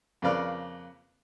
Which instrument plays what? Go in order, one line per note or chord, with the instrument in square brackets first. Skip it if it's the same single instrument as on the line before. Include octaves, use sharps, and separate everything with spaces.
[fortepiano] F2 C#3 A#3 B4 D5 F6